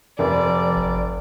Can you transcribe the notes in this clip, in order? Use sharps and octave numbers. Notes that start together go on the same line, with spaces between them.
F1 F3 D5
G#1